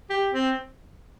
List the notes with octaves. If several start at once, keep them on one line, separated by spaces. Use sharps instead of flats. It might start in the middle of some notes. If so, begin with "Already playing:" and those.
G4
C4